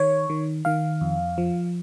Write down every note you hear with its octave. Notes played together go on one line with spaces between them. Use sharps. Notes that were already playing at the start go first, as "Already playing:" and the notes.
Already playing: D#3 C#5
D#3
D#3 F5
F2
F3